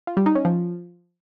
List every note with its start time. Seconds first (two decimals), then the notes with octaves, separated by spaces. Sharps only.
0.07 F4
0.17 G3
0.26 D#4
0.35 C#4
0.45 F3